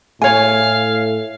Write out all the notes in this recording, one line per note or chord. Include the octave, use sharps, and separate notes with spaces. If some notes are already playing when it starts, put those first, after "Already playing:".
A2 C#5 F5 G#5